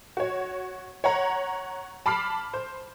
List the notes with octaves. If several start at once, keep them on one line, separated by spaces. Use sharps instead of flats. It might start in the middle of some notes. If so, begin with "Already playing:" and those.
F#4 C#5
C#5 F#5 A#5
A5 B5 D6 F6 C7
C5